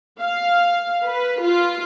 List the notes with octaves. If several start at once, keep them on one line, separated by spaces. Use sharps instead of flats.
F5
B4
F4